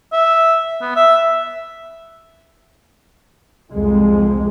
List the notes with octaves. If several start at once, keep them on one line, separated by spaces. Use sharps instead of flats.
E5
B3
E5
C2 F2 G#3